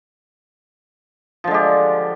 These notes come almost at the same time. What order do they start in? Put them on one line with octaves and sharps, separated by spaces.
F3 D3 G#3 G4